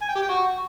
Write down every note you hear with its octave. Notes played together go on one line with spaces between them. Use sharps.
G#5
G5
G4
G5
F#4